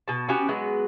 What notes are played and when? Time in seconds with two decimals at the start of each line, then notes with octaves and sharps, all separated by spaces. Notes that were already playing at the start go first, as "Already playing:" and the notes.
0.08 B2 A5
0.29 B3 C#4 F#4 G4
0.49 F#3 G#3 B3 B4